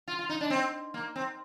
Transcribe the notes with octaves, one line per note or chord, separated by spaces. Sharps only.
F4
F4
D#4
D4
C4
A#3
C4